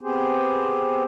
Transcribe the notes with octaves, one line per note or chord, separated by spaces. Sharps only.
B3 C4 G4 G#4 C5